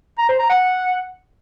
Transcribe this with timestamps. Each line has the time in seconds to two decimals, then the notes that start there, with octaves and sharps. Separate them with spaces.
0.18 A#5
0.28 C5
0.39 A#5
0.49 F#5